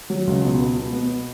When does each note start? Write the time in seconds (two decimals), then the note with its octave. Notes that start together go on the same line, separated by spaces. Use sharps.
0.10 F#3
0.27 C#2
0.43 B2
0.59 B3
0.77 B2
0.93 B3